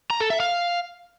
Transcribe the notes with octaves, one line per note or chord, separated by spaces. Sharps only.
A#5
A4
E5
F5